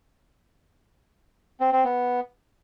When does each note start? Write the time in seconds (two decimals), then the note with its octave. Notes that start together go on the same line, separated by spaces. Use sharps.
1.60 C4
1.72 C4
1.84 B3